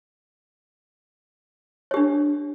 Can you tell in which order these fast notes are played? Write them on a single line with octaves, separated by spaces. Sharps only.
C#5 G4 D4